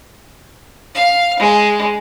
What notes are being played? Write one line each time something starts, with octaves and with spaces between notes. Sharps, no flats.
F5
G#3